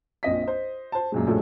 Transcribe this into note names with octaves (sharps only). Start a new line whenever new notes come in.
A#1 C4 D#5 B6
C5 D#5
C5 A5
F#2 A#2 G#3
A#1 A2 F#3 G#3 A4 G#5